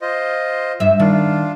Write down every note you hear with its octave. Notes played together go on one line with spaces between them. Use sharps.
F4 C5 D#5
G2 E5
D#3 D4 F4